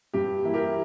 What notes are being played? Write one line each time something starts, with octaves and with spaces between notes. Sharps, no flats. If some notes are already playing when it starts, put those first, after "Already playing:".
G2 G4
E3 A#3 E4
G4 A#4